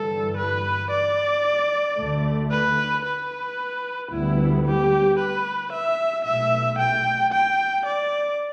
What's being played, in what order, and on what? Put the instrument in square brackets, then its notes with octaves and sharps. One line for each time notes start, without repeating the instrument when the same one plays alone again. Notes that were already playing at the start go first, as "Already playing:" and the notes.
Already playing: [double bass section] G1 G2 E3 G3 [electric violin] A4
[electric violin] B4
D5
[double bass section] D2 D3 A3
[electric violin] B4
B4
[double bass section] D2 D3 G3 B3 [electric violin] E4
[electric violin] G4
B4
E5
[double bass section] B1 B2 A3 [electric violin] E5
[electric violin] G5
G5
D5